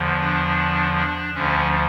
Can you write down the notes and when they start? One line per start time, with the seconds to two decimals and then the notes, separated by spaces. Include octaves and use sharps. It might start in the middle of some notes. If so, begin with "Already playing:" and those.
Already playing: E2 D3 F3
0.19 D4
0.96 D4
1.34 D2 D3 F3 C#4